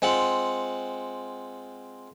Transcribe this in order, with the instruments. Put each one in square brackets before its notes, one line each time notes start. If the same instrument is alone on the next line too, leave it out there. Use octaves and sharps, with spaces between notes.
[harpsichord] G#3 C4 F4 F#5